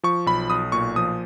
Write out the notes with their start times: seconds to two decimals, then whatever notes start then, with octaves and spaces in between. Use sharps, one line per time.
0.04 F3 C#6
0.26 B1 B5
0.50 B1 D#6
0.72 A#2 C#6
0.96 F3 D#6